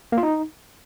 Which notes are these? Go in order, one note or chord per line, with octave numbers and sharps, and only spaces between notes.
A#3
F4
D#4